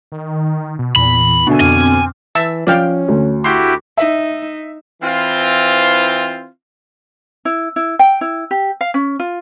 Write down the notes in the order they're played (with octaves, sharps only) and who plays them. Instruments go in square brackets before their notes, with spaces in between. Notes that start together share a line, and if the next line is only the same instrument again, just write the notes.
[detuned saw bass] D#3
B2
[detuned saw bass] E2 [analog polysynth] A#2 [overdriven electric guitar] B5
[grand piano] B2 D3 [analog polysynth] D4 E5 G#5
[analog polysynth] F2 D6 F6 [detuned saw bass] C4 [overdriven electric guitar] G#5
[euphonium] E3 [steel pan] E5 A5 E6
[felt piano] F3 [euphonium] C#4 [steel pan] D5 F5 G5
[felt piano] D2
[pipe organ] E4 F#4 G4 [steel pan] C6
[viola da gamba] D#4 [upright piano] E5
[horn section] E3 C4 F4
[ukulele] E4
E4
G5
E4
G4
F5
C#4
F4